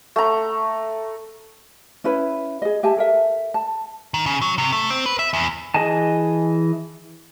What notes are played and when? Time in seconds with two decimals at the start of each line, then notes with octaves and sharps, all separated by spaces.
0.16 A3 A#5
2.04 C#4 E4 B4
2.62 G#4 D#5
2.83 G4 E5 G#5 A5
2.97 A4 A#4 E5
3.54 A5
4.14 D#3
4.26 C#3
4.42 F#3
4.58 C3
4.72 A3
4.90 C4
5.06 B4
5.19 E5
5.33 E2
5.74 E3 G#4 D#5 G#5 A5